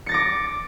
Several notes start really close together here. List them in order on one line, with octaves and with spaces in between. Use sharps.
C#7 A6 A#6 D6